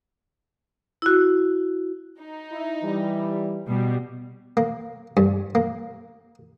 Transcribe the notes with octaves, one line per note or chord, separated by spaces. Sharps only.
E4 F#4
D#4
E4
E3 G3
B2 G3
A#3
G2
A#3